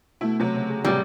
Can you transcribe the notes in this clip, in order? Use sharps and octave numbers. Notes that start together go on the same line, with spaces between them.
B2 A3 E4
C3 F#3
C#3
G#4
A1 C3 F#3 G3